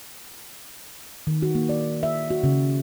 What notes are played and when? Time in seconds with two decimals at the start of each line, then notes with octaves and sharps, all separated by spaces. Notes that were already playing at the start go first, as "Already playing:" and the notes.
1.27 D#3
1.42 F#4
1.55 A#3
1.69 D5
2.03 E5
2.30 F#4
2.44 C#3